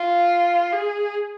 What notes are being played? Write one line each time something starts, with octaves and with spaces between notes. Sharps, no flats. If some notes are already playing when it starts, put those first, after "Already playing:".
Already playing: F4
G#4